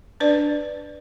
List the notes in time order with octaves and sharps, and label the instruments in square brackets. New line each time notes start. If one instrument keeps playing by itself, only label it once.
[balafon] D4 B4 D5